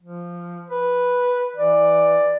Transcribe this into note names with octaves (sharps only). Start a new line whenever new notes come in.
F3
B4
E3 D5